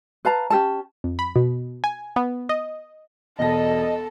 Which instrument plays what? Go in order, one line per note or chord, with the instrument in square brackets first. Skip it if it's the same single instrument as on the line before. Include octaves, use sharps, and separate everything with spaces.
[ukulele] B4 F5 A5 A#5
C#4 G4 A4 A5
[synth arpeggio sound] F2
B5
B2
G#5
B3
D#5
[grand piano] E1 B2 A#6 [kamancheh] A4 A5 [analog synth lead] D#5